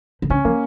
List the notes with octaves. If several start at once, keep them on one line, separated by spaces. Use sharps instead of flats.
C#3
D3 C#4
F3 A#3